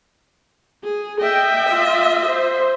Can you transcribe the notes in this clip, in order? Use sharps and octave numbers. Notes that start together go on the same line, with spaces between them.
G#4
D#5 E5 G5
F4
C5